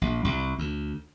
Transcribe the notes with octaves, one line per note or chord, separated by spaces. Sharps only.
A#1
C2
D2